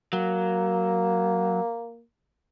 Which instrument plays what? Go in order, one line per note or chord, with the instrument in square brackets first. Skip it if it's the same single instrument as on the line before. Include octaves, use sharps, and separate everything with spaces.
[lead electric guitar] F#3 [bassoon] A#3